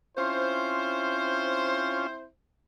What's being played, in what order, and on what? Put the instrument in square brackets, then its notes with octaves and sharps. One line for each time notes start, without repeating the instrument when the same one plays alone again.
[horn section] C4 E4 C5 [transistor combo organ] C#4 F4